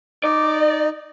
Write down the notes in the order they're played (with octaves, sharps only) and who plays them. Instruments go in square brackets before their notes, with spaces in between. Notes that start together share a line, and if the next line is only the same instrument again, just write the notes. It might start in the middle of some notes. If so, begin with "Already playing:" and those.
[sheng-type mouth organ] D#4 [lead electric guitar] D5